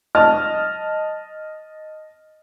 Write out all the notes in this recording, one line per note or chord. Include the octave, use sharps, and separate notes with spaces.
D#5 A5 F6